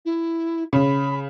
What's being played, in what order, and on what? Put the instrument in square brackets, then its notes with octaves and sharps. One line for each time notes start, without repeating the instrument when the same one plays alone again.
[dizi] E4
[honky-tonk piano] C#3 [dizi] B5